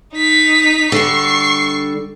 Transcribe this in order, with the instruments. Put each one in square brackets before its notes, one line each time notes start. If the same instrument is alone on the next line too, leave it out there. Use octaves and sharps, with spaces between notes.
[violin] D#4 B6
[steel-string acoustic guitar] D3 G3 [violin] C#6 C7